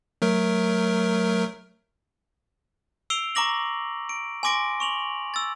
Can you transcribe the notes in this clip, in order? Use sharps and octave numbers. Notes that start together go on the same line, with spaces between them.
F#3 A3 A#4
E6 C7 D7 F7 G7
A#5 C#6 D6 A#6 F#7
D7
G#5 C6 D6 A#6 D7
C#6 F7 F#7
E6 A6